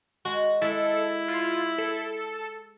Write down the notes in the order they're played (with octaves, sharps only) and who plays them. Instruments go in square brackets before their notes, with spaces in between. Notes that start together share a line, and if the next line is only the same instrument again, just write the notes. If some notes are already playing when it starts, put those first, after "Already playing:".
[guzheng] G#3 [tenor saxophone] F#4
[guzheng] G#3 [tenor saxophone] E4 [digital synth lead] A4
[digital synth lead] F4
A4